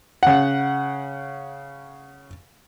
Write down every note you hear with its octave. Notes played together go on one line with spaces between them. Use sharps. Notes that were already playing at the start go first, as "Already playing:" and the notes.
C#3 F#5